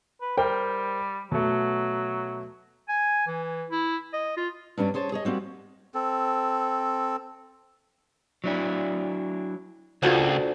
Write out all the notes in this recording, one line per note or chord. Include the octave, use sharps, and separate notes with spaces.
B4
G3 A#4 C5 G5
B2 F#3 A3
G#5
E3
E4
D#5
F4
G2 G3 C#4 D4
C#4 G#4 C5 A5
G#4 C#5 D#5
G3 A#3 C4 F#4
C4 A4
F#3 D4 E4
C#2 D4 F4 F#4 A4 C5 F#5